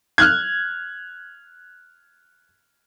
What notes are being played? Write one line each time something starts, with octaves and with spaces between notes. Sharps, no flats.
F6 F#6 G#6